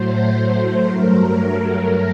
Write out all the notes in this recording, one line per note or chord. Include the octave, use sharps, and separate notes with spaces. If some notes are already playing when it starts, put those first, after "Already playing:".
Already playing: A2 F#3 A3 C5
G2 F#3 A3 A#4